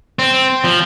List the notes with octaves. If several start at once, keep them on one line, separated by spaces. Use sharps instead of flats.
C4
F3